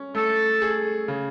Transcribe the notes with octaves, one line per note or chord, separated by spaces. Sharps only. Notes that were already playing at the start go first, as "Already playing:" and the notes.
Already playing: C#4
A3 A4
G#4
C#3